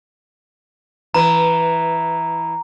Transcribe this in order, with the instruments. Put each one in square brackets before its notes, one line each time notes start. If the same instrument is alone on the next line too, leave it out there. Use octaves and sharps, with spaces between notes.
[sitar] E3 B4 [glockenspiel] A#5